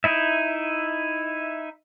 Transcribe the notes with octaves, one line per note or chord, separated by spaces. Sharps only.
D#4 E4 E5